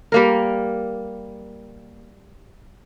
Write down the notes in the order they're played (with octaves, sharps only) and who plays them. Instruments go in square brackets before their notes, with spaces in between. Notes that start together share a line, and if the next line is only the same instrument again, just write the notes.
[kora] G3 A#3 A#4